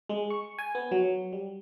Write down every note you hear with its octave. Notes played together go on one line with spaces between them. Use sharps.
G#3
C#6
G#5
B3
F#3
G3